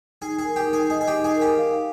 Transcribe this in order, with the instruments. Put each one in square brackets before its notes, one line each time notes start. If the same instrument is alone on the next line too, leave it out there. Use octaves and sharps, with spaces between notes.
[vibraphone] D#4 [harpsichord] G#4
[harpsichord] G#4
[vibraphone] A#4
[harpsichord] G4
[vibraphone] D#4
[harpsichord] G#4
[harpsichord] G#4 [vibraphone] D#5
[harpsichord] G#4
[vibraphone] D#4 [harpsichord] G4
[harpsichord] G#4
[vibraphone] A#4
[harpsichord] G4
[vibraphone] F5